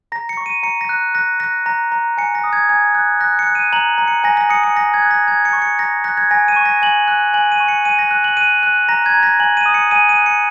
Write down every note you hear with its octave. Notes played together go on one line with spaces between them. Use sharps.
A#5 A#6
C#7
C#6
D#7
A#5 C#7
A#6
F#6
F#6 A#6
F#6 A#6
A#5 A#6
A#5
G#5 C#7
A#6
D#6
G#6
G#5 G#6
F#6
F#6 A#6
C#7
F#6
D#7
A#5 F#7
A#5
C#7
G#5 A#6
A#6
D#6 C#7
C#7
G#5 A#6
G#6
F#6
A#6
A#5 G#6
C#7
C#6
C#7
A#5 A#6
F#6 A#6
G#6
G#5 A#6
D#7
C#6
A#6
G#5 F#7
F#6
G#5 F#7
D#7
C#6
C#7
G#5 D#7
A#6
F#6
F#7
F#6 D#7
F#6
A#5 A#6
G#6
A#5
A#6
G#5 F#7
D#7
D#6
C#7
G#5 D#7
D#7
F#6
C#7